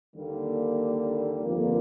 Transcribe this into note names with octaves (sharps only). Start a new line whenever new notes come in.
D#2 D3 G3 A#3
G1 F2 D3 G3 A#3